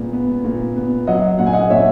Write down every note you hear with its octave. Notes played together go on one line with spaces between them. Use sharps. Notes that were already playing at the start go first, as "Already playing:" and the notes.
Already playing: A#2 G#3 B3
B3
A#2
B3
F#3 D#5 F#5
A#2 F#5
G#5
D#5 F#5
A#2 C#5 E5